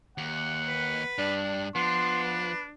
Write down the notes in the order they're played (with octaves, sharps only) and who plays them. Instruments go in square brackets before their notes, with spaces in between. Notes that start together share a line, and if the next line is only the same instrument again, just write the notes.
[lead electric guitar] D#2 [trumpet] F#5
[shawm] B4
[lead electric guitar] G2 [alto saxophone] D4
[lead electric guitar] F3 [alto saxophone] B3 [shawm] D4 [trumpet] C6
[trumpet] B4